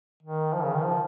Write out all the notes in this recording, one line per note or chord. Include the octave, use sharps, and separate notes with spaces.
D#3
F3
C#3
D#3
F3